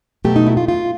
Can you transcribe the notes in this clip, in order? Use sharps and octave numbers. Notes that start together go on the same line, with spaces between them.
B2 F#3 A3 G4
D#4
E4
F4
F4